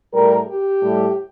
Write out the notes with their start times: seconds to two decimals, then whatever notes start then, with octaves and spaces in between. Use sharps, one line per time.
0.13 A2 G3 A#4
0.47 G4
0.80 A2 G3